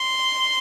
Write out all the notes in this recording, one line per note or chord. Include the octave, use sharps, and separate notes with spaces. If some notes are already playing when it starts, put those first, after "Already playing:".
Already playing: C6